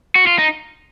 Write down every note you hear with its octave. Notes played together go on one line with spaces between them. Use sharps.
F#4
F4
D#4